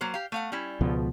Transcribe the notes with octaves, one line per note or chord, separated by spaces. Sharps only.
F#3 A#3 C5
G4 F5
A3 F5 F#5
G3 C#4 E4
C#2 B2 F3